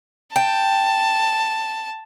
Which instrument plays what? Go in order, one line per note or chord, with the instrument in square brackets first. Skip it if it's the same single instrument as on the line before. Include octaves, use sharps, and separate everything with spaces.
[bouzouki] G5 [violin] A5